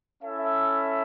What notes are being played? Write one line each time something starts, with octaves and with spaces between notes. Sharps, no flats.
C#4 E4 A4 E5